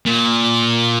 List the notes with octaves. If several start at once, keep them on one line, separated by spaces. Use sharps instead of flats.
A#2